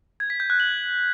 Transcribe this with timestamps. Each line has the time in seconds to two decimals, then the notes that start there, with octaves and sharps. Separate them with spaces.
0.20 G#6
0.30 B6
0.40 G6
0.50 F#6
0.60 F#7